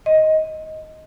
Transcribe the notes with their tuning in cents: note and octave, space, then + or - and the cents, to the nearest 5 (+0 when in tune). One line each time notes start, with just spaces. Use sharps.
D#5 +10